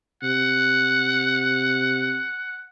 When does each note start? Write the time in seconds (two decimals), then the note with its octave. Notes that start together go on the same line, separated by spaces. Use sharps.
0.23 C3 F#5